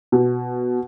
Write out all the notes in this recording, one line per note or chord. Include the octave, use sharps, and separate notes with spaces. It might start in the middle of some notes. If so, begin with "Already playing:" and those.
B2